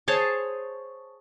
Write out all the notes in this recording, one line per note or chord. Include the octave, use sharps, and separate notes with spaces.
G#4 C5 C#5 A5